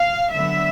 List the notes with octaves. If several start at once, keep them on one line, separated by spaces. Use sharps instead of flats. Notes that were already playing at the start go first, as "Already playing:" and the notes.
Already playing: F5
D3 F#3 B3 E5